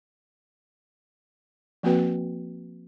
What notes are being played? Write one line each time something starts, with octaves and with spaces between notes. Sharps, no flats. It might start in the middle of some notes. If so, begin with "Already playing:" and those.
F3 A#3 C4 F#4 B4 G5